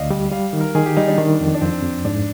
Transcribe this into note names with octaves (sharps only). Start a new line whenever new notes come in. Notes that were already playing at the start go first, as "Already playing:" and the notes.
Already playing: D2 D5 D#5 F5
G3
G3 F5
D#3
A#4
D#3 G#4
G4
G3 D#4
D4
D#3
F2
D4
F2 C4
F2
G#2 D4